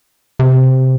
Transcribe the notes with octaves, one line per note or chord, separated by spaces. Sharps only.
C3